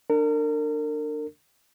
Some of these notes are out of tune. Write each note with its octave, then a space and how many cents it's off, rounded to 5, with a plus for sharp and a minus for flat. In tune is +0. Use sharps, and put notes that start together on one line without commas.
D4 +20 A#4 -35